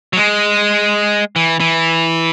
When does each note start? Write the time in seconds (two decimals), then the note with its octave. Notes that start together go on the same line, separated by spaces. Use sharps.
0.13 F#3
0.17 G#3
1.36 E3
1.60 E3